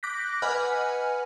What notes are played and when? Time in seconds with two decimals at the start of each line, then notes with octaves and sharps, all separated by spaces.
0.03 D6 F#6 G6 A#6 B6
0.42 B4 D#5 F#5 G#5 B5 F6